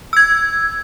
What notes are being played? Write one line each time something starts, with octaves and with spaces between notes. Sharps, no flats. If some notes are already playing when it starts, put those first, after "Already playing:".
E6 G#6